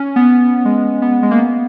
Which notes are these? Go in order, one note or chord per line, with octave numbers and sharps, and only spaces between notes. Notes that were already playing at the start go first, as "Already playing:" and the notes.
Already playing: C#4
B3
G#3
B3
G#3
A#3
B3